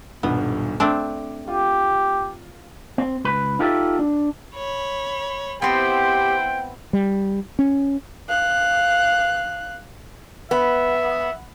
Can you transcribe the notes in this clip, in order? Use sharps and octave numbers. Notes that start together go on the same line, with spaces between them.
D#1 B1 G2 B3
A3 C4 D4 D6
F4 G4
C4
C#2 B4
D#4 F4 G4 A4 D#5 E5
D4
C#5 B5
B3 C4 E4 G4 C5 G5
G3
C#4
F5 F#6
B3 E5